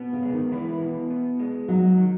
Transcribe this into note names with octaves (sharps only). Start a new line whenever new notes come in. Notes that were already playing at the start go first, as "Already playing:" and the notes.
Already playing: B2 B3
C#3
G#3
D#3
E3 E4
B2
B3
G#3
F#3 D#4
D#3